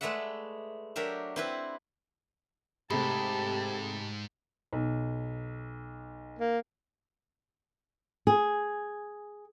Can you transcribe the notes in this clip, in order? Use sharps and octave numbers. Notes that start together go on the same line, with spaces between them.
G#3 A3 B4 D5 E5 F#5
F#3 D4 G4 A#4 E5
C4 E4 B4
G#2 C3 A3 G4 G#4 A5 B5
B1
A#3
G#4